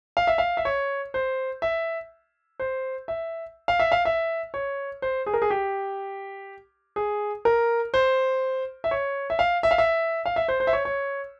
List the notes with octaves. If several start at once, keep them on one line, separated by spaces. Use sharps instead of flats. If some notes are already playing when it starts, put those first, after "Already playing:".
F5
E5
F5
E5
C#5
C5
E5
C5
E5
F5
E5
F5
E5
C#5
C5
G#4
A#4
G#4
G4
G#4
A#4
C5
E5
C#5
E5
F5
E5
F5
E5
F5
E5
C5
C5
E5
C#5
C#5